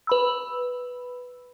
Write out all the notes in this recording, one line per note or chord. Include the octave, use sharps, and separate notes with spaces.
B4 B5 E6